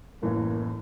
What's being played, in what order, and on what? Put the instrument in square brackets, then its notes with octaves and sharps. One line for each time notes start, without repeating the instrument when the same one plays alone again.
[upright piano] F#1 A2 E3 [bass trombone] A#3